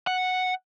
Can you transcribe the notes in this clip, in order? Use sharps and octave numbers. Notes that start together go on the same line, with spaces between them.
F#5